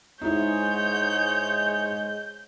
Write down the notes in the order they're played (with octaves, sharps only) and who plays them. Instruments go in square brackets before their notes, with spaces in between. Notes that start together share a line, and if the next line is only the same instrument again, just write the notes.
[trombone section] G#2 G#3 [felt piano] D#4 E4 [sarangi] C#5 [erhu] G6